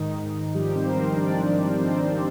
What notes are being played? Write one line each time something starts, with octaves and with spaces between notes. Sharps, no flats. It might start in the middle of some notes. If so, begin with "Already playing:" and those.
Already playing: G#2 D#3 D#4
G#2
F3 G3 G4
C4 C5
F3 A#4
C4 C5
F3 D4 D5
F3
F3 C4 C5
C4 C5